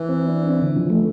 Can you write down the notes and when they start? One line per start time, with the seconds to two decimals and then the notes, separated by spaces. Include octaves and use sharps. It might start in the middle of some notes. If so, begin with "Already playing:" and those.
Already playing: E3
0.09 C4
0.28 D4
0.47 C4
0.62 D3
0.76 F3
0.90 A3